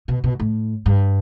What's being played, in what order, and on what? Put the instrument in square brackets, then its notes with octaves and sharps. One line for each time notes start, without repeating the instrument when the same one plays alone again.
[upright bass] B2
B2
A2
G2